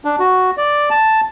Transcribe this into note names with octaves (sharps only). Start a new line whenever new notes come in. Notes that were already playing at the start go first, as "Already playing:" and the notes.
D4
F#4
D5
A5